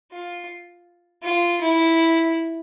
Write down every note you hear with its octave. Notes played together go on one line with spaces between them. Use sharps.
F4
F4
E4